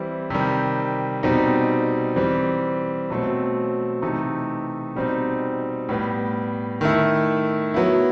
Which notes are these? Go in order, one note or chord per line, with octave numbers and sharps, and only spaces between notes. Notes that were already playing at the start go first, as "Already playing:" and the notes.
Already playing: E3 G3 C4 E4
C3 D#3 G3
B2 G3 C4 D#4
E3 G3 C4
B2 F#3 A3 C4
C3 E3 A3 D#4
B2 G3 C4 D#4
A2 G3 B3
D#3 A3 E4
F#3 B3 E4